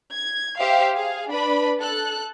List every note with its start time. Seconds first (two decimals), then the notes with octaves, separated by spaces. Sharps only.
0.13 G#6
0.58 G4 C5 E5 F5
0.95 G#4 F5
1.30 D4 B4 B5
1.78 A4 F#6